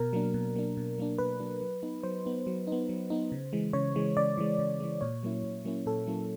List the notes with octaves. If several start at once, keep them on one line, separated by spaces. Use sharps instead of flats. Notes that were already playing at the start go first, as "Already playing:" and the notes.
Already playing: B2 A#4
F#3 A#3 D4
B2
F#3 A#3 D4
B2
F#3 A#3 D4
B2 B4
F#3 A#3 D4
F#3
B3 D#4
F#3 C5
B3 D#4
F#3
B3 D#4
F#3
B3 D#4
C#3
E3 G#3
C#3 C#5
E3 G#3
C#3 D5
E3 G#3
C#3
E3 G#3
A#2 C#5
F#3 A#3 C#4 E4
A#2
F#3 A#3 C#4 E4
A#2 A4
F#3 A#3 C#4 E4